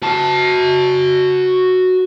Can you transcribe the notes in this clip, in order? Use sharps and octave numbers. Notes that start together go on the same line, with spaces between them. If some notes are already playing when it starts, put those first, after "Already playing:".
F#4 A5